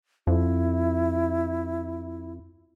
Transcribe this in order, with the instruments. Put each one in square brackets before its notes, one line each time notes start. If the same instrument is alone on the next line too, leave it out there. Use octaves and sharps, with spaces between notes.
[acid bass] F2 [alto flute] E4